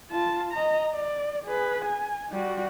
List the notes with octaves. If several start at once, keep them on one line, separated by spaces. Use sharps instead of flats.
F4 A5
D#5 A#5
D5
G#4 B4
G#5
G3 F#4